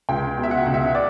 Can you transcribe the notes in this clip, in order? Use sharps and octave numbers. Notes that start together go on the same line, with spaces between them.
C#2 G5
B2
E5
F#5
C#2
E5
D5